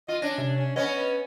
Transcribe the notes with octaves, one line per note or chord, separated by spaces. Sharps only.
F4 D#5
C#4 D4 A#6
C3
C#4
B3 C#4 C#5 D#5